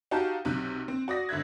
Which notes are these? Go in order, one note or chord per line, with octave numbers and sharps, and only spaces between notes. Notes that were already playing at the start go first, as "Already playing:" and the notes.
D#4 F#4 G4 F5 A5
B1 C3 F#6
C4
F#4 D5 D#6 A#6
G#1 D3 E5 F#6 G#6